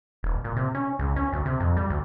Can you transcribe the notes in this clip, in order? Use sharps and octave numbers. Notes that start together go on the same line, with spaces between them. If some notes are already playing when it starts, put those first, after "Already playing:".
D#1
A#2
C3
C#4
C#2
C#4
D2
C3
F2
G3
D2